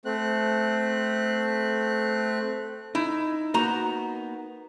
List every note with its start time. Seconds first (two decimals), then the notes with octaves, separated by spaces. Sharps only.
0.05 A3 C4 F#6
2.95 D#4 E4
3.54 A#3 B3 D#4 F#4 A#5